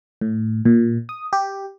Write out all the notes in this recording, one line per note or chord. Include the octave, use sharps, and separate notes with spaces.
A2
A#2
D#6
G4